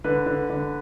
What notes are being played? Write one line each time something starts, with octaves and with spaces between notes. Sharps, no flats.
D3 B4
D3
D3